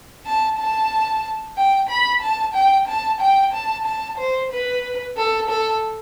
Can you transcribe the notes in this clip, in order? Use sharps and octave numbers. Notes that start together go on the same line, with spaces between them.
A5
A5
G5
B5
A5
G5
A5
G5
A5
A5
C5
B4
A4
A4